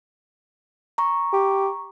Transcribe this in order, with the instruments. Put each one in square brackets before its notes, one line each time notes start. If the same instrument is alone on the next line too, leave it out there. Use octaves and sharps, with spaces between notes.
[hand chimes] A#5 C#6
[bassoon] G4